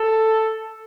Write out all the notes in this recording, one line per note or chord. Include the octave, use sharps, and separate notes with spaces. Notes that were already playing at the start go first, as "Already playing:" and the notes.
Already playing: A4